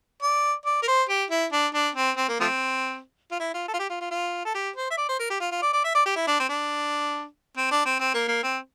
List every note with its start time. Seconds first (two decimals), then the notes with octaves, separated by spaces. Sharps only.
0.22 D5
0.66 D5
0.83 A#4
0.88 C5
1.09 G4
1.30 E4
1.52 D4
1.74 D4
1.95 C4
2.17 C4
2.29 A#3
2.40 F3 A3 C4
3.31 F4
3.40 E4
3.54 F4
3.68 A4
3.74 F4
3.79 G4
3.90 F4
4.00 F4
4.11 F4
4.45 A4
4.55 G4
4.76 C5
4.90 E5
4.97 D5
5.09 C5
5.19 A#4
5.30 G4
5.40 F4
5.51 F4
5.62 D5
5.73 D5
5.84 E5
5.95 D5
6.06 G4
6.16 E4
6.27 D4
6.40 C4
6.49 D4
7.57 C4
7.71 D4
7.85 C4
8.00 C4
8.14 A#3
8.28 A#3
8.43 C4